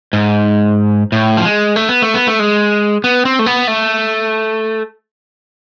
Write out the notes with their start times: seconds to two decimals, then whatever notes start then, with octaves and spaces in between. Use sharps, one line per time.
0.13 G#2
1.12 A2
1.37 F3
1.45 G#3
1.76 A3
1.89 B3
2.02 A3
2.14 B3
2.28 A3
2.40 G#3
3.04 B3
3.25 C4
3.39 A3
3.46 B3
3.68 A3